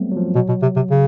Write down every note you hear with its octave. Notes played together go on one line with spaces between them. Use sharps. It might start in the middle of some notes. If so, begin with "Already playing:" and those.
Already playing: F#3 G3 A3 B3 C4
F#3
F3
B2 F#3
B2
C3
C3
C#3